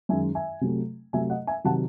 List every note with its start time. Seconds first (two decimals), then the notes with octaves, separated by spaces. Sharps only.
0.09 F#2 D#3 G#3 E5 G#5
0.35 E5 G#5
0.61 C3 F#3 A3
1.13 C3 F#3 A3 E5 G#5
1.30 D#5 F#5
1.47 E5 G#5
1.64 C3 D#3 F#3 F#5 A5